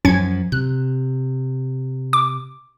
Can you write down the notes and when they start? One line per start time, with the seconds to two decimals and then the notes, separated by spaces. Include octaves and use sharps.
0.05 F#2 F3 C#4 G#6 C#7
0.52 C3 F#6
2.13 D6